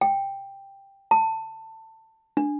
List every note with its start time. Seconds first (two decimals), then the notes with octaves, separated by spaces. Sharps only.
0.01 G5
1.11 A5
2.37 D4